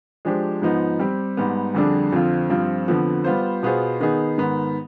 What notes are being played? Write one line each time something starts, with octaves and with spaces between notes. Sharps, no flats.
F3 G#3 D4 G4 C5
G#2 F3 B3 D#4
G3 C4 G4
G#2 G3 B3
F2 D3 G3 D4 G#4
F2 D3 F3 C4 F4
G2 F3 C4 F4
F2 D3 F3 B3
G3 B3 F4 C5
B2 B3 F4 G#4 C5
D#3 B3 D#4 G#4
G#2 D#3 B3